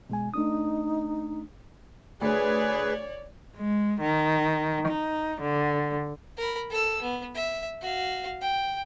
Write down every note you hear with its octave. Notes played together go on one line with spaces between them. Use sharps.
B2 G#3 G#5
A3 D4 D#4 D#6
D2 G#4 B4 C#5 D5
G#3
D#3
D#4
D3
A#4 B5
A4 E6
B3
E5
F#4 F5
G5